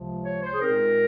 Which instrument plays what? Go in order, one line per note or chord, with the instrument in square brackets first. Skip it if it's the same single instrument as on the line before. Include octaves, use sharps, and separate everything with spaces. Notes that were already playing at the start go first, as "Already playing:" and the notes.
Already playing: [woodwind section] C#2 C3 F3
C#5
C5
G#4
A#2 G#3 C4 D#4 A#4